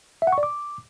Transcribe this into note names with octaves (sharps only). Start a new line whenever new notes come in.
E5
F#5
C#6
D5
D6